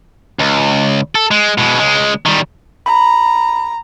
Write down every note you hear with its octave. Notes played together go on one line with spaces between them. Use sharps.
C#2
A4
G#3
B2 G#3
C#2 G#3
D#3 G3
A#5 B5